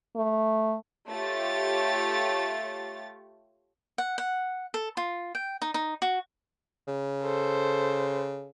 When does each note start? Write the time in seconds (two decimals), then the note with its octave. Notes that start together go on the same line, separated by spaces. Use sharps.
0.16 A3
1.09 A3 F4 G4 C#5 A6
3.98 F#5
4.18 F#5
4.74 A4
4.97 F4
5.35 G5
5.62 D#4
5.74 D#4
6.02 F#4
6.87 C#3
7.23 A4 C5